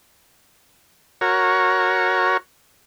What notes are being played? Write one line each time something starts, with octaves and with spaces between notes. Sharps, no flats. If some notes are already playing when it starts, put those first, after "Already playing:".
F#4 A#4 C#5